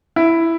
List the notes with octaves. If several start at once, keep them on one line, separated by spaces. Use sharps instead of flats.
E4